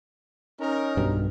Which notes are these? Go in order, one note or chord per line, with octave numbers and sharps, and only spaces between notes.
C#4 D#4 A#4
B1 G2